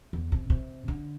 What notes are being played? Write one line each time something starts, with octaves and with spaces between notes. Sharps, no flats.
E2
C3
C3
D3